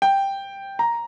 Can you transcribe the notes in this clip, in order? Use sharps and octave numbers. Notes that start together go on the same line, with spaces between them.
G5
A#5